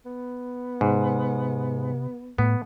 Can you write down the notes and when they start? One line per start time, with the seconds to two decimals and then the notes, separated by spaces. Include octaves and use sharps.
0.06 B3
0.81 G#2 C3
2.38 A2 B3